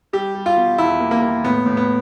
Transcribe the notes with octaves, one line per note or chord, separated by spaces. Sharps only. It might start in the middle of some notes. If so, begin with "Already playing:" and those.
G3 G4
G3
F4
B2
E2 E4
A#3
A#3
A#3
A2 B3
A2
B3